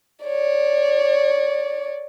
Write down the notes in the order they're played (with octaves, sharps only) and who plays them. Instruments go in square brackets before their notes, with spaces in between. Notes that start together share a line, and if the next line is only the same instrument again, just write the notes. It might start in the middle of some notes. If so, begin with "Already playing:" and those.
[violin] C#5 D5